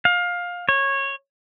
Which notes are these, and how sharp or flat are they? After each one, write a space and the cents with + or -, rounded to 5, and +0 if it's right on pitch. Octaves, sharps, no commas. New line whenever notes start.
F5 +20
C#5 -15